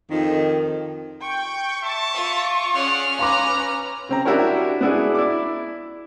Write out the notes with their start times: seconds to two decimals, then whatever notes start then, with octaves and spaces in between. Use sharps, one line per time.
0.10 F2 D#3
1.21 G5 C#6
1.83 E5 A5
2.14 F4 C#6
2.74 C#4 G#4 D5 F#5 F6
3.19 B4 F5 A#5 C6 D6
4.09 C#3 C4 A#5
4.25 D4 E4 F#4 G4 A#4 C#5
4.81 B3 D4 E4 F#4 G#4
5.15 E4 D5 D6